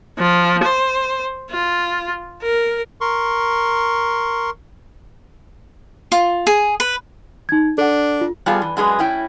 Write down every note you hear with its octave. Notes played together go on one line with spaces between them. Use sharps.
F3
C5
F4
A#4
A#4 C6 C#6
F4
G#4
B4
D#4 G#6
D4 A4 F#5
F4
G3 B3 F4 G#4 A4
E3
F#2 G#3 G#4 B4
A2 C#4 E4 G5